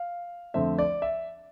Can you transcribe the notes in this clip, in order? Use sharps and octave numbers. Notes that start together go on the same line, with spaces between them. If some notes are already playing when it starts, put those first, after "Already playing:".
Already playing: F5
F2 D3 A3 C4 E5
D5
E5